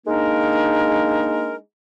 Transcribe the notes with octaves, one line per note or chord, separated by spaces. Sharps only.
G#3 A#3 D4 D#4 A#4